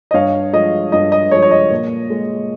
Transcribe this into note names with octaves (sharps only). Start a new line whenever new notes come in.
D#5
G2 C#5 F5
F3 G#3 D#5
G2 D#5
D#5
F3 G#3 C#5
C#5
D#5
A#2
G#3